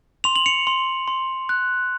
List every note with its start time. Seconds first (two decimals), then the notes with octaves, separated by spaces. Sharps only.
0.24 C6 F7
0.36 F#7
0.46 C#7 F7
0.67 C6
1.08 C6
1.49 F#6